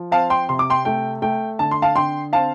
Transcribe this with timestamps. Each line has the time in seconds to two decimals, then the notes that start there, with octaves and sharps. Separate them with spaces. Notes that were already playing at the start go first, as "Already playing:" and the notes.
Already playing: F3
0.11 C4 F5 A5
0.30 G5 C6
0.49 C3 C6
0.59 D6
0.70 G5 C6
0.85 A3 G5
1.22 A3 G5
1.59 D3 A5
1.71 C6
1.82 F5 A5
1.96 D3 G5 C6
2.33 C4 F5 A5